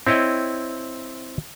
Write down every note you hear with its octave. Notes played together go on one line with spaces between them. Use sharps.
C4 E4 C#5 D#5 G5